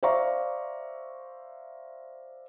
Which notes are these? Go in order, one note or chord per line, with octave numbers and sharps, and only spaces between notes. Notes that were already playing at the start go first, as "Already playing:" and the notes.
C5 D5 E5 F5 A#5 C#6